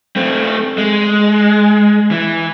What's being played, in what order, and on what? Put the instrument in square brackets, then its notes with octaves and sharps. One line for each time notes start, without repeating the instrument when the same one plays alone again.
[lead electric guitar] A3 C4
G#3
E3